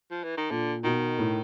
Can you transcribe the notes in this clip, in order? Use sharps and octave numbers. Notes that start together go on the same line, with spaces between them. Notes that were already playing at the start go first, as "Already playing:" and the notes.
F3
E3
D#3
A#2 D3
B2 D#3
A2